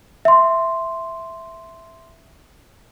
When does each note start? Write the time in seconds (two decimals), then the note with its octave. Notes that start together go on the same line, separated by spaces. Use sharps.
0.25 E5 C6